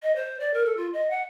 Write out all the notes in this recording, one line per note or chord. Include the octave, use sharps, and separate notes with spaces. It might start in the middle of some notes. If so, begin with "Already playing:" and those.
D#5
C5
D5
A#4
A4
F4
D#5
F#5